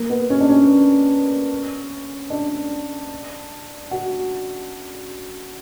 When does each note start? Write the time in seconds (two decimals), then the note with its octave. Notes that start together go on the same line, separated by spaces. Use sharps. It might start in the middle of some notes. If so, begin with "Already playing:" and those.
Already playing: A#3
0.10 B3
0.30 C#4
0.41 D4
0.49 C#4
2.30 D4
3.91 F#4